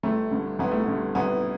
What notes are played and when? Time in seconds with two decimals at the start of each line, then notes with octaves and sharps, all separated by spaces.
0.03 G1 A3
0.31 G2 D3
0.59 G1 B3
0.72 A3
0.83 G2 D3 B3
1.15 G1 B3